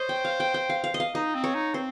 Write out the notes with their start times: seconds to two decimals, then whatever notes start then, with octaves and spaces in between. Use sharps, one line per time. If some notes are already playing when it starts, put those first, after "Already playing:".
Already playing: C5 C#5 D#5
0.09 G5
0.25 F5
0.40 G5
0.54 G5
0.70 F5
0.84 F5
0.94 D#5
1.00 F5
1.15 D#4 D#5
1.35 C4
1.44 C#5
1.55 D#4
1.74 C4 C5